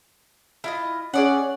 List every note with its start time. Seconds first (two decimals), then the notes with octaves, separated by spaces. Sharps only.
0.64 E4 F4 D#5
1.14 C#4 G#4 D5 F#5